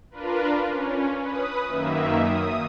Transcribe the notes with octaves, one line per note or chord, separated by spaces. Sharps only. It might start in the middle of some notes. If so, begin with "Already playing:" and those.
D4 F4 A#4 B4
C#4
B4 D#6
F#2 D#3 A#3 E5
D#6